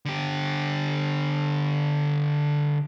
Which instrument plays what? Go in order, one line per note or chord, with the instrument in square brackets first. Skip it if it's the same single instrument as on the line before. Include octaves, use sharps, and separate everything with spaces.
[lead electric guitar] D3 G4